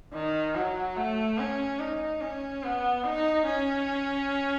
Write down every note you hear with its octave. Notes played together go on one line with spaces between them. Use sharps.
D#3
F#3
A3
C#4
D#4
C#4
B3
D#4
C#4